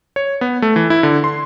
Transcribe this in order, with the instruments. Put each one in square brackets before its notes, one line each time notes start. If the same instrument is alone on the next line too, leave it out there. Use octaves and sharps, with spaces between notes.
[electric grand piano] C#5
B3
A3
E3
E4
D3
C6